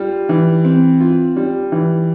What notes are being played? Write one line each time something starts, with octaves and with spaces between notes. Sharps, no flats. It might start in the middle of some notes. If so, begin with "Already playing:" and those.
Already playing: G3 F4
E3
C4
F4
G3
E3